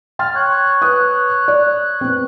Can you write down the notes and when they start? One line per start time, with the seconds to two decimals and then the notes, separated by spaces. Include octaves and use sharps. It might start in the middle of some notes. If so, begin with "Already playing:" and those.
0.19 G5 C6 F6 A6
0.36 C#5 F#6
0.82 B4 D#6
1.48 D5
2.01 B3 C4